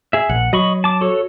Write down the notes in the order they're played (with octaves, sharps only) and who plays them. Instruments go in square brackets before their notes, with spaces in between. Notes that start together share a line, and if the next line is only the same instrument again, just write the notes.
[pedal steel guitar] G#4 E5
[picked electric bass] A#1 [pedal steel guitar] F#5
[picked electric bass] F#3 [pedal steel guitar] D#5 B5 C#6
[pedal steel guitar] A5 D6
F#4 A4 C#5